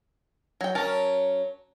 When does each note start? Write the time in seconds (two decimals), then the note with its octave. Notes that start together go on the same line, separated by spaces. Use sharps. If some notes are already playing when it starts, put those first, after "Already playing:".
0.61 F#3 G5
0.75 F#3 C#4 A#4 A5